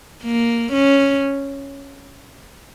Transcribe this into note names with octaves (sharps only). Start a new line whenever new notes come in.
A#3
C#4